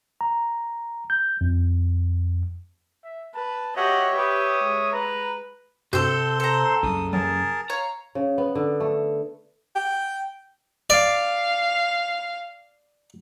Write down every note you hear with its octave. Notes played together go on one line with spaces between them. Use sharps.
A#5
G6
F2
E5
B4 A5
F#4 G4 C#5 D#5 E5 F#5
G4 B4 D#6
G#3
B4 A#5
G2 C3 C4 F#4 A4 C5 C6 G6
A4 A#5
C2 F#2 C#3 D#6
E3 F#3 G#4 A#4 A5
C#5 F5 A#5
C#3
B3
D3
A3
G5
D5 F5